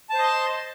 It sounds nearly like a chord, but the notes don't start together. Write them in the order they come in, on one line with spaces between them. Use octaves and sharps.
A5 C5 D#5 C6